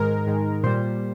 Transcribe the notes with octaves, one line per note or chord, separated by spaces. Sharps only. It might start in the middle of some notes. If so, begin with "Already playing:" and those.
Already playing: G#2 D#3 G#3 A#4
G#2 D#3 G#3
A#2 G3 C5